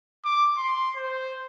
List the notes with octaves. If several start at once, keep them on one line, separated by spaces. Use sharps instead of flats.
D6
C6
C5